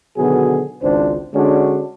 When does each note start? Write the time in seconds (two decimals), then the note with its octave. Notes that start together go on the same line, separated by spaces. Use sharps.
0.17 B2 D3 D#3 F#3 B3 G#4
0.82 G#1 C#2 D4 C5
1.34 D3 G#3 C#4 D4 F#4